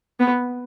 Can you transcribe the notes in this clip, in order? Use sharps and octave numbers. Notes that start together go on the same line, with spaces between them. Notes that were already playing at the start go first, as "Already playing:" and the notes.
B3